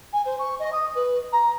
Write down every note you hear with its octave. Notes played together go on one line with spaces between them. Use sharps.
G#5
C5
C#6
D#5
D#6
B4
A#5